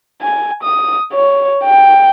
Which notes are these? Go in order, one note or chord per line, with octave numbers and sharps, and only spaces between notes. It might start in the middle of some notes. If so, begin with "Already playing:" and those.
G#5
D#6
C#5
G5